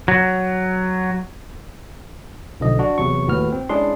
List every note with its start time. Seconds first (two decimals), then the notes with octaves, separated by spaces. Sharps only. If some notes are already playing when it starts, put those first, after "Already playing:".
0.08 F#3
2.60 B1 D3 F3 D#5
2.79 D4 F#4
2.98 E2 C3 F#3 C#6
3.28 D#2 A2 F#4 B4 F6
3.52 C4
3.69 G#3 C#4 D4 E4 G#4 C6